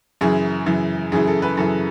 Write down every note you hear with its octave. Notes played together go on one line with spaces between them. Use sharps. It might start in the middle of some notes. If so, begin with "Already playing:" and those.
F#2 C#3 E3 G#4
F#2 C#3 E3
F#2 C#3 E3 G#4
A4
B4
F#2 C#3 E3 A4